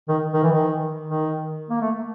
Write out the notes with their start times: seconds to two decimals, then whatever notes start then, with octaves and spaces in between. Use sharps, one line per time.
0.08 D#3
0.33 D#3
0.43 E3
0.52 D#3
1.07 D#3
1.69 A#3
1.81 A3